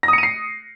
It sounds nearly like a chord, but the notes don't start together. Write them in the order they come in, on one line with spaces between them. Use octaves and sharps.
A#6 D#6 C#7 D#7 C7